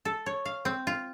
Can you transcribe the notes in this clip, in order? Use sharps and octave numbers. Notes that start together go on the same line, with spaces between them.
A4
C#5
F5
C4
F4